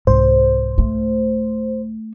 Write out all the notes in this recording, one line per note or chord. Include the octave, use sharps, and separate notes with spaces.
C2 G#2 C5
A3